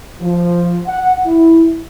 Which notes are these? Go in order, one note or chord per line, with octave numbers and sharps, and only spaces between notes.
F3
F#5
E4